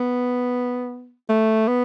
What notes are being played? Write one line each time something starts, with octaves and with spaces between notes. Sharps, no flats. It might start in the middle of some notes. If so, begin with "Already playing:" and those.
Already playing: B3
A3
B3